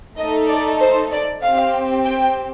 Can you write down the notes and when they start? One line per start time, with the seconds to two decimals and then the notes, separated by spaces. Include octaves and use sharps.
0.17 A3 D#4 A4 D#5
0.48 D5
0.80 C5
1.12 D5
1.42 C4 G4 F5
2.05 G5